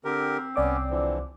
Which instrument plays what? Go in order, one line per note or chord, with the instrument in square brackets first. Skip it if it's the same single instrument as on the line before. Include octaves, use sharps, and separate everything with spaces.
[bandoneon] D3 G4 A#4 [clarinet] C4
[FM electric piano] C2 D5 D6 [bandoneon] B3 C#4
[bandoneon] D3 E3 F3